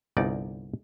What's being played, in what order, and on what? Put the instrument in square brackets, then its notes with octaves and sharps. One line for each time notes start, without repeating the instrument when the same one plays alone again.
[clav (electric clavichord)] G1 C2 D#4 D5